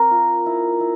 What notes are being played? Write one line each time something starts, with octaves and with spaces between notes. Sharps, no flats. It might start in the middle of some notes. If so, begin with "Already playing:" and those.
Already playing: C4 A#4
F4
E4
E4